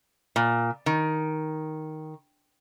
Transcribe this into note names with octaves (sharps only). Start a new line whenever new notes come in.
A#2
D#3